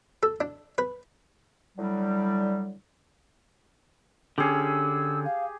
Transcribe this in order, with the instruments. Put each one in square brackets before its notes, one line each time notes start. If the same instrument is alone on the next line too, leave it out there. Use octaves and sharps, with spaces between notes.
[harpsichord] A4
D4
B4
[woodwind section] A2 D3 F#3 G3
[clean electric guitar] D3 C#4 [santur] G4 G#4 [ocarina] E6
[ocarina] F5